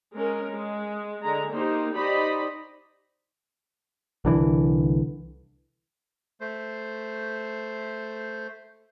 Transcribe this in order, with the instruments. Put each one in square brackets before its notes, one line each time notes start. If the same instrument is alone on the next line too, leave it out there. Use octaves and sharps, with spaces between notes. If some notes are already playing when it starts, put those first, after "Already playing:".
[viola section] G#3 C#4 A#4
G#3
D3 G#3 A#5
A#3 D#4 G4 C5
D#4 G4 C5 D5 D#5 B5
[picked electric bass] C2 D3 E3
[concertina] A3 C5